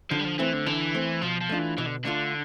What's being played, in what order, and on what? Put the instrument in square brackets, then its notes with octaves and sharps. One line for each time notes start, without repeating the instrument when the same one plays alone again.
[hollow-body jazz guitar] D3 [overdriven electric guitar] F3
[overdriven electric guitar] G3
F3
[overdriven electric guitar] E3 [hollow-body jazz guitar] A3 C4
[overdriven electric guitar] D3
[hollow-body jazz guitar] D3 [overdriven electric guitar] E3
[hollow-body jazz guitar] A3 C4
[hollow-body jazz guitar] B2 [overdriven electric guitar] F3
[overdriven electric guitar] F3
[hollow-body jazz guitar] A3 D4 F4
[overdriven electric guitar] E3
[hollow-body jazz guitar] B2 [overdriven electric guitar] E3
[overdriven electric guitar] D3
[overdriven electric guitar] D3 [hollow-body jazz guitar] A3 D4 F4